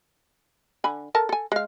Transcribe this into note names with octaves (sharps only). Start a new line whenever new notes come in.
D3 G#5 B5
A4 A#4 A5
A4 G#5
G#3 F5